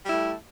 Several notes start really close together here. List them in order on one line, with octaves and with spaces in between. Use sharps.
G3 E4 A3